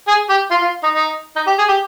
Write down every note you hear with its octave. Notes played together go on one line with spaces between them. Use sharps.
G#4
G4
F4
F4
D#4
D#4
D#4
G4
G#4
G4